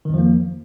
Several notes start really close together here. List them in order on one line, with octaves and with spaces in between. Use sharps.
D#3 F2 F3 A#3